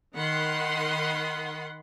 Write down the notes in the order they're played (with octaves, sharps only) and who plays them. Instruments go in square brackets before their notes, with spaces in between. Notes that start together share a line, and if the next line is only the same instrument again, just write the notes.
[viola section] D#3 F#5 B5 C6